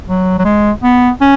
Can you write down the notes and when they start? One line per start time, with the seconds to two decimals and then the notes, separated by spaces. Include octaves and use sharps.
0.07 F#3
0.39 F#3
0.45 G#3
0.83 B3
1.21 C#4